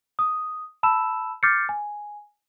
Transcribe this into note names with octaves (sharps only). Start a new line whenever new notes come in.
D#6
A5 B5 E6 E7
D6 F6 G6 A6 C7 C#7
G#5